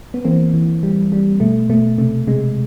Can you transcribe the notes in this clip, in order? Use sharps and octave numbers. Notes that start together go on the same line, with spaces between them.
B3
E3 A#3 C4
E3
G3
G3
B2 A3
B2 A3
C3 A3
C3 G#3